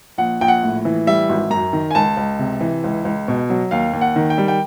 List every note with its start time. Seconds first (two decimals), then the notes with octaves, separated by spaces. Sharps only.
0.18 A#1 F#5
0.41 A#1 G5
0.48 F#5
0.63 A2
0.85 E3
1.07 G3 E5
1.29 G#1
1.50 F#2 A#5
1.73 D#3
1.91 G#5
1.95 C#2 A5
2.17 C#2
2.39 C3
2.61 E3
2.84 C#2
3.05 C#2
3.28 B2
3.50 F#3
3.71 D#2 F5
3.93 D#2
4.01 F#5
4.16 D#3
4.30 G5
4.38 G3
4.48 G5